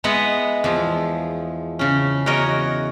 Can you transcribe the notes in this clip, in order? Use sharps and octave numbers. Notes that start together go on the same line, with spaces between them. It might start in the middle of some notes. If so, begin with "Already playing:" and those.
G#3 B3 E4 B4 D#5 F#5
E2 F3
C#3 C#4
E2 F#4 A#4 C#5 D#5